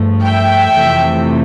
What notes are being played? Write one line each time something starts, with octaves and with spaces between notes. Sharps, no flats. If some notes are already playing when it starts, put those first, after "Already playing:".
Already playing: G2 F3 A3
E5 G5
F2 C3 E3 A3